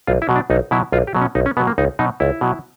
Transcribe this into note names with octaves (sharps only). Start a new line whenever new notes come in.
B1 F4
E4
B2 F#3
D4
B1 D#4
B2 F#3 E4
B1 F4
G4
B2 F#3
C#4
B1 D#4
C#4
B2 F#3 B3
A#3
C#2 D#4
B2 F#3 D#4
C#2 E4
B2 F#3